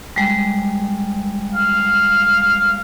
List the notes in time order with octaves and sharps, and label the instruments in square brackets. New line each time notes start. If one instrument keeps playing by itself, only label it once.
[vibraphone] G3 G#3
[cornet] F5